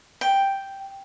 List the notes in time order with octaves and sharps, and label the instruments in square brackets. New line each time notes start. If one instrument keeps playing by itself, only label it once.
[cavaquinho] G5